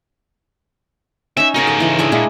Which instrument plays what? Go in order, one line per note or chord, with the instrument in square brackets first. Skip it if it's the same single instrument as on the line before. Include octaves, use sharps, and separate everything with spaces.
[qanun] C#4 D#4 [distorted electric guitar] E5
[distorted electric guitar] C#3 D#4 [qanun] F#4 A#4 G#5
[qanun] A4
E3 D#5
D4 G#4 E5
[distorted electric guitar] A#2 [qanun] G#3 D4 E4